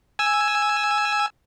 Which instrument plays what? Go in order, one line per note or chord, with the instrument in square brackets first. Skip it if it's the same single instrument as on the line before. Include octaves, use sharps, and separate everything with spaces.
[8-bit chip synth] G#5 E6